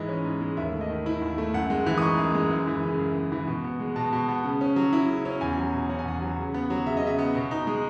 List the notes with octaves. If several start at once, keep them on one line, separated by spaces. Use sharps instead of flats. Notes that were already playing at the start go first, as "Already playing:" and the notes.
Already playing: G#2 E3 G#3 D#5
C#4
G#2
G#3
D#2 E5
A3
D#5
D#3
E4
D#2
A3
F#2 F#5
G#3
E3
D#6
D#4 C#6
F#2
G#3
F#2
E3
C#3
F#2
F#2
E3
B2
B3
G#3
B2 A5
B2
B3
C#3
C#4
F#3
E4
C#3
C#4
E2 G#5
F#3
B2
C#4 F#5
G#5
E2 F#5
F#3
C#3
B3
F#3
C#3 E5
D#5
C#3 E5
B3
B2
D#4
G#3